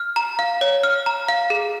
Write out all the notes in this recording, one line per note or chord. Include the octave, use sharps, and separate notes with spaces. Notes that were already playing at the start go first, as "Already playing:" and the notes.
Already playing: F6
A#5
F5
C#5
F6
A#5
F5
G#4